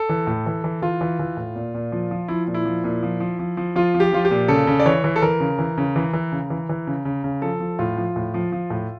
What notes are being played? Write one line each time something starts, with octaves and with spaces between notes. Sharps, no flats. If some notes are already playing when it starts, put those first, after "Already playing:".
Already playing: A4
E3
A2
E3
E3
E3 F4
E3
E3
A2
A#2
A#2
F3
F3
F3 E4
A#2
E4
F3
A#2
F3
F3
F3
F3
F3 F4
F3
G4
F3 F4
G4
A#2
C#3 A4
C#3
D5
E3 C#5
E3
A4
E3 A#4
C#3
E3
C#3
E3
E3
C#3
E3
E3
C#3
C#3
C#3
F3 A4
F3
A2 F4
F3
A2
F3
F3
A2